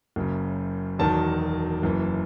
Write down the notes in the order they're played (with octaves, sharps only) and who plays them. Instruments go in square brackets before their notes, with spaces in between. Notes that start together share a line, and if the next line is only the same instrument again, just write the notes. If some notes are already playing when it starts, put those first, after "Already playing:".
[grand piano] F#1 F#2 C#3
E1 E2 D#3 F#3 A5
F#1 F#2 E3